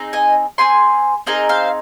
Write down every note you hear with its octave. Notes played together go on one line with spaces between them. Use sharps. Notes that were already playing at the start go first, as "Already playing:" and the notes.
Already playing: C4 D#4 G#4
D#5 G#5
C4 G#4 G#5 C6
C4 D#4 G#4 A#4 D#5
C5 F5